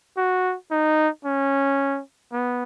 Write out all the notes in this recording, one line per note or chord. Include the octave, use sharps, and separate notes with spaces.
F#4
D#4
C#4
B3